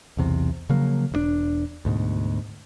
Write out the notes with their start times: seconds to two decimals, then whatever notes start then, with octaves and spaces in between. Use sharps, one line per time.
0.17 B1 E2 C3
0.70 C#3 F3 F#3 A#3
1.12 E1 G2 D4
1.85 D2 G#2 B2